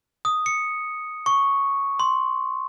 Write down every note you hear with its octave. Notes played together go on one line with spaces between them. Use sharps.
D#6
C#7
C#6
C6